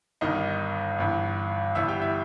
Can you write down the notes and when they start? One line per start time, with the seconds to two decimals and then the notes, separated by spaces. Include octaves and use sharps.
0.21 G1 G2 D#3 D#4 D#5
0.98 G1 G2 E3
1.75 G1 G2 E3 E4 E5
1.88 G4 G5
2.01 E4 E5